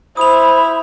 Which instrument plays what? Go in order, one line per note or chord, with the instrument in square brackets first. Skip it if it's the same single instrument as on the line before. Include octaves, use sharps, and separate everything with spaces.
[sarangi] E4 [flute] C5 [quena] B5 [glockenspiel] D#6 F7